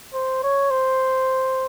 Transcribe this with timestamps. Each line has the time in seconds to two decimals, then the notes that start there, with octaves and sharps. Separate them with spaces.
0.14 C5
0.43 C#5
0.71 C5